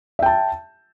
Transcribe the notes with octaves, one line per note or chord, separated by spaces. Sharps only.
E5 G5 A5